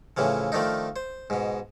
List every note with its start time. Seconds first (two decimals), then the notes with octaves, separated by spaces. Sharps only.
0.17 A2 C#3 E3 F3
0.52 D#3 F3 A3 D4 D#4
0.96 C5
1.30 G#2 B2